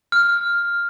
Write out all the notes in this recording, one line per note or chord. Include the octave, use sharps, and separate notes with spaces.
F6